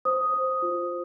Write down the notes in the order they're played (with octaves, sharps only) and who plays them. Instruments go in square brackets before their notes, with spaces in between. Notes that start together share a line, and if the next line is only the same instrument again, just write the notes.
[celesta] C5 D#6
C5
F4